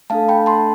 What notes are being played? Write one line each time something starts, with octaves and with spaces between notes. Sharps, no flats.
A3 D4 A4 F5 A5
G5 B5
A5 C6